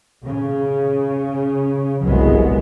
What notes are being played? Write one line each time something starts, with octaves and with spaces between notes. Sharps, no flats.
C#3
G1 C2 F#3 G#3 B3